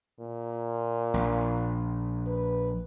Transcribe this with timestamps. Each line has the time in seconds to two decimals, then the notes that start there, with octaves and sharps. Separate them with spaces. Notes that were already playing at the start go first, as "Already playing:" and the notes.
0.20 A#2
1.14 A#1
2.27 B4